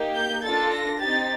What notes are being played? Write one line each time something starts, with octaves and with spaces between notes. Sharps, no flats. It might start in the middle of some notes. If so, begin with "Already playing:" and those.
Already playing: A#3 D#4 G4
G6
D4 F4 A4 A6
A#6
C4 D#4 G4 A6